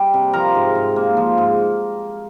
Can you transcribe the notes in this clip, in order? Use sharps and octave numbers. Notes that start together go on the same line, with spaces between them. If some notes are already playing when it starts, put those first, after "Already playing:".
Already playing: G3 G4 G5
C3
F3 A#4 A#5
G#2
G#2
A#3
F3
G#2